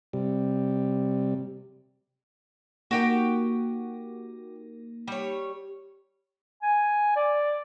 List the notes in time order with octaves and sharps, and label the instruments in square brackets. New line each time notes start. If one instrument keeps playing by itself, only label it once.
[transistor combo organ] C3 G3
[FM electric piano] A#3 D#4 A#4 [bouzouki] F#4 G4 G5
[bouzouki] G3 C#5
[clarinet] G#5
D5